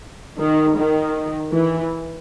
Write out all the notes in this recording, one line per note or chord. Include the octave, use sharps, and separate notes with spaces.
D#3
D#3
E3